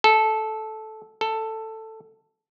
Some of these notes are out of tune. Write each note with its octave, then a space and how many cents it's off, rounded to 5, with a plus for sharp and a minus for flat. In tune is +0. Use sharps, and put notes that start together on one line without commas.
A4 -10
A4 +10